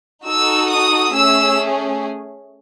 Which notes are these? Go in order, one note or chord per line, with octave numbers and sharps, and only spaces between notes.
D#4 F#4 A4 E6
D#6
A3 C#4 G#4 E6